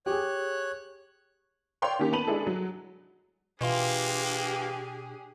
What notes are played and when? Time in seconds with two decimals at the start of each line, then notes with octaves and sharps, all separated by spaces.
0.06 G4 G#4 C#5 F#6
1.82 C#5 D5 F5 G5 C6 D6
1.99 D#3 A#3 C#4 G4
2.12 B3 A5 B5 D#7 F#7
2.27 G#3 D4 E4 G#4 A4
2.47 F#3
3.61 B2 E3 A#3 D4 F4 G4 G#4 C6